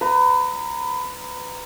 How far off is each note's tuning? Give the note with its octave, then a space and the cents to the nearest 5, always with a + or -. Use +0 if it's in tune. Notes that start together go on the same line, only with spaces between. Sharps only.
B4 +25 A#5 +0